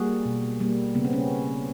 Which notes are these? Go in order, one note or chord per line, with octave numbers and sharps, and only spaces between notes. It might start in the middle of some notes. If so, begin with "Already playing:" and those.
Already playing: G3 A#3 F#4 G#4
B2
G3 A#3
C#3 B3
C4
B3 C#4